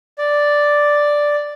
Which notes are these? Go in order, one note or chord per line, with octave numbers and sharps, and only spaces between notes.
D5